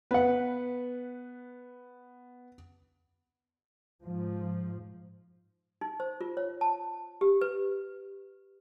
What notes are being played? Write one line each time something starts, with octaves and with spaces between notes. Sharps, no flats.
B3 B4 F#5
G#2 F3
D#4
C5
F4
C#5
A5
G4
B4